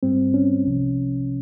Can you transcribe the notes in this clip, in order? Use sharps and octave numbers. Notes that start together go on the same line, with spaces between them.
G#2 G3 C4
C#4
C2 C3 F3